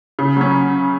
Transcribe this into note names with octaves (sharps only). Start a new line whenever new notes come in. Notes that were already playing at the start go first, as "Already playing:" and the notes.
C#3
F#3 C#4